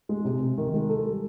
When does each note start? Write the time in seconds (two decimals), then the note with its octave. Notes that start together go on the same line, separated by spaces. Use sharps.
0.09 G#3
0.25 C3
0.41 C3
0.57 D#3
0.74 G#3
0.89 A4
1.05 G3